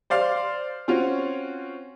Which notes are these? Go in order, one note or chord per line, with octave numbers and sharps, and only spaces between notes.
C5 D5 F5 C6 F6
C4 C#4 F4 F#4 C#5